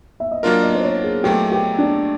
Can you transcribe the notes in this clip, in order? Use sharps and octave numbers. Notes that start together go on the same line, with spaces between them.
E5
D#5
F#3 A#3 D4 F4 A#4 D5
D#5
C5
C#5
G#4
A#2 F#3 A3 G4
G4
D4